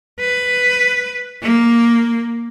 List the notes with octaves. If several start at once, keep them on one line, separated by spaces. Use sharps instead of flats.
B4
A#3